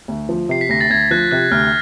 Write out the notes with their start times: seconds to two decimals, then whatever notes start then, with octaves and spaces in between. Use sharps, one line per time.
0.08 D2
0.29 F3
0.49 C3 C7
0.61 B6
0.69 D2 A#6
0.81 A6
0.90 D2 G#6
1.11 F3 F#6
1.31 C3 F#6
1.51 D2 F6